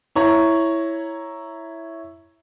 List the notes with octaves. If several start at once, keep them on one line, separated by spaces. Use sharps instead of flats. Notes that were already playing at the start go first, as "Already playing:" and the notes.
E4 C#5 A#5